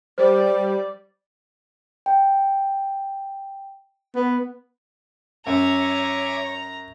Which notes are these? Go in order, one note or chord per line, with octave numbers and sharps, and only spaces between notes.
G3 C5 D5
G5
B3
F#2 C#5 E5 G#5 A#5 D6